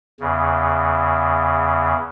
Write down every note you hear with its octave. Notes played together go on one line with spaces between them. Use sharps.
E2 C#3